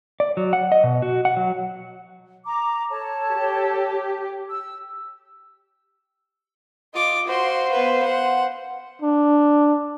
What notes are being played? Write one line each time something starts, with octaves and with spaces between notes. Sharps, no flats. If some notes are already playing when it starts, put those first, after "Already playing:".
D5
F#3
F#5
D#5
B2
F#4
F#5
F#3
A#5 D6
A4 C#5 A5
G4
E6
F4 D#5 D6
F#4 C5 F5 C6
B3 B4
F#5
D4